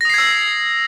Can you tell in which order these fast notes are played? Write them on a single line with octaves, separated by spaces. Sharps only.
A#6 D#6 C7 G#6 E6